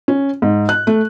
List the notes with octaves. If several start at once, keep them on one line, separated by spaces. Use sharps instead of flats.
C#4
G#2
F#6
A3